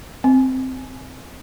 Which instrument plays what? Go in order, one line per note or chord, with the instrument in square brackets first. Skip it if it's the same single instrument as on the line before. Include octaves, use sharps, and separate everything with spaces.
[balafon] C4